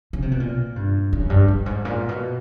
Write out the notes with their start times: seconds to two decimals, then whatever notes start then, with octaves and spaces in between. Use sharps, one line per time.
0.13 C#3
0.22 C3
0.31 B2
0.40 A#2
0.76 G2
1.13 F#2
1.30 G2
1.48 G2
1.66 G#2
1.85 A#2
2.09 B2